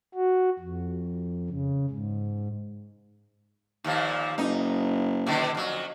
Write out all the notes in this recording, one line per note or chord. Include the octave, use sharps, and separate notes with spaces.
F#4
F2
C#3
G#2
D#2 A#2 F3
F#1 D#4
B2 D3 D#3
F2 F#3